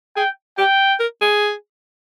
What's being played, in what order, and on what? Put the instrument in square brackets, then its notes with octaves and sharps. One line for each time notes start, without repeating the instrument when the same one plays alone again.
[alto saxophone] G#4 [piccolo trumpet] G5
[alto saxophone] G4 [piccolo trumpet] G5
[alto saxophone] A#4
G#4